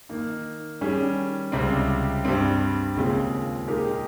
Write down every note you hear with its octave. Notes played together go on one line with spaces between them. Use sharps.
D#3 A#3 D#4
D#3 G3 C#4 G#4
C#2 C3 G3 C4
G2 G3 C4
D#2 C#3 G#3 C4 F4
A#2 G#3 D#4 G4 A#4